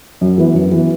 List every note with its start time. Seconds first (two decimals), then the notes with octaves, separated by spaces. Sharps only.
0.21 F#2
0.38 E3 B3
0.55 F#2
0.72 E3 B3